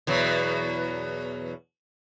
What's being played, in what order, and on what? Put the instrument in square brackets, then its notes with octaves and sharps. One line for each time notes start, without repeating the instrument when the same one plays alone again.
[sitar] E2 B2 F#3